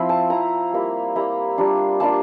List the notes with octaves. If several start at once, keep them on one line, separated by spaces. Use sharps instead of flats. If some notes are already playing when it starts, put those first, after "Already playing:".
Already playing: F3 C4 E4
A5
F3 C4 E4 A#5
G3 A#3 E4
G3 A#3 E4 A#5
G3 A#3 D4 F4
G3 A#3 D4 F4 A5